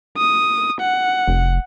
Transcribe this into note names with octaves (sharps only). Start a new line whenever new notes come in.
D#6
F#5
F1